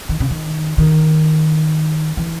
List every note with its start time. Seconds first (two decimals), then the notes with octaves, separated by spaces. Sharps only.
0.09 D#3
0.20 C#3
0.31 D#3
0.78 D#3
2.17 E3